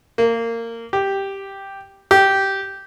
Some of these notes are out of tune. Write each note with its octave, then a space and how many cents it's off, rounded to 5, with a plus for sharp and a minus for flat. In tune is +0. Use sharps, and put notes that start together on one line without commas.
A#3 -20
G4 +0
G4 -10